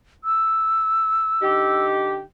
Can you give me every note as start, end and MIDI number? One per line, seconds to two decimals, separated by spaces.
0.24 1.86 88
1.42 2.21 50
1.42 2.21 63
1.42 2.21 67